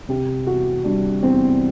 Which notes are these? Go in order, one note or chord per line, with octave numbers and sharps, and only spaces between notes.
C3 G4
E2 F#4
G3 D4
E2 C4